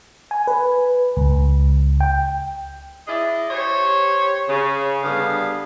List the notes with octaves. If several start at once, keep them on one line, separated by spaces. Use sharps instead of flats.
G#5
B4
C#2
G5
E4 G#4 D5 D#5
G4 C5 C#5
C#3
G2 D3 B3 G#4 F5